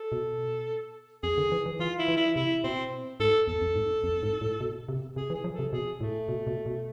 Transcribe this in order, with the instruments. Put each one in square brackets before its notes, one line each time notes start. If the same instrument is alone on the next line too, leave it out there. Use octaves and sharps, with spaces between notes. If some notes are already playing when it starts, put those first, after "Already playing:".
Already playing: [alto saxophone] A4
[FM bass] B2
[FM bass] F2 [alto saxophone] G#4
[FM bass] D3
E3
E3
[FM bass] E3 [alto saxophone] F4
[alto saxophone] E4
[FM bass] E3
[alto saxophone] E4
[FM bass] C3 [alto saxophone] E4
[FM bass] B2 [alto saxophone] C4
[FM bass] G#2 [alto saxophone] A4
[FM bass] E2 [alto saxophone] A4
[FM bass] F2
G#2
F2
G#2
A2
B2
C3
[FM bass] C3 [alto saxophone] G#4
[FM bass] E3
[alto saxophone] G#4
[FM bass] F3
[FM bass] C3 [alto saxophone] A4
[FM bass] B2 [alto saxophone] G#4
[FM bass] A2 [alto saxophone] A3
[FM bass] B2
B2
B2